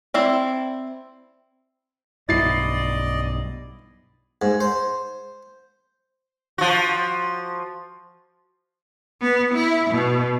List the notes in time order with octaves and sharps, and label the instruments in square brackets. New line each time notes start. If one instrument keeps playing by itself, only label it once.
[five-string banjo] C4 E4 D5
[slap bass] B1 G2 [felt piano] E4 C7 [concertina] D5 D#5 [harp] A6
[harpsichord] G#2
C5
[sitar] F3 F#4
[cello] B3
E4
B2